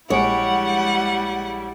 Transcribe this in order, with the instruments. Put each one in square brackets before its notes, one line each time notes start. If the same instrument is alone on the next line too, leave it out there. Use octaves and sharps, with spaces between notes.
[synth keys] A#1 G#3 D7 [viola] G3 E4 [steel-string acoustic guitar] C#5 [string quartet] F#5